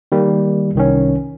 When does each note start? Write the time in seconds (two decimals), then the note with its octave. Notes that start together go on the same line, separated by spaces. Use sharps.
0.12 D#3 G3 A#3
0.75 C2 D#3 C#4